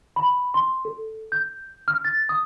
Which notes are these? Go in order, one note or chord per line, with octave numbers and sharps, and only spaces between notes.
B5
C6
A4
G6
F6
A6
D#6